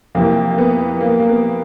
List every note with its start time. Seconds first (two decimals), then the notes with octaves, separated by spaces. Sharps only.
0.15 F2 C3 E3 A#3
0.51 A#3
0.58 B3
1.01 A#3
1.20 A#3
1.29 B3